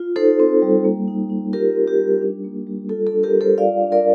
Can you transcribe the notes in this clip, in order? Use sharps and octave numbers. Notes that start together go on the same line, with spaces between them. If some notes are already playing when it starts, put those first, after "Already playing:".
Already playing: F4
D#4 A4 C5
C4
G3
A#3
D#4
D#4
F4 G4 A#4
C4
G4
G3
D4
A#3
G3
F4 A4
A4
D4
G4 A#4
G3
A4 C5
F4 D5 F5
D4
A#4 D5